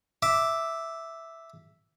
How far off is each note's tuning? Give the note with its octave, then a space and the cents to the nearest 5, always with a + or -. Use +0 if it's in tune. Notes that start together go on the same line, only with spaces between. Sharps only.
E5 +0 D6 +0